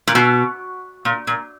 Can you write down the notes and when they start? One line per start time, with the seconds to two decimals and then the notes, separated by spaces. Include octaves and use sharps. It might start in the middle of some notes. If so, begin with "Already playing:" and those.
0.08 A#2
0.15 B2
1.05 A#2
1.27 A#2